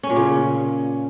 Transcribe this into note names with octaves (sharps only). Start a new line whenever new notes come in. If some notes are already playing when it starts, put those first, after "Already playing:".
C#4
A#2
C#3